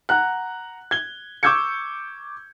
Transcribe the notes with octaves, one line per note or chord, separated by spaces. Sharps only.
F#5 A#5 F#6
G#6 G7
C#6 D6 E6 G6 G#6 C#7